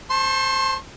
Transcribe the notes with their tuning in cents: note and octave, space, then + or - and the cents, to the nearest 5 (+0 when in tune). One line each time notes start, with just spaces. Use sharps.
C5 -5 A5 +0 C6 +45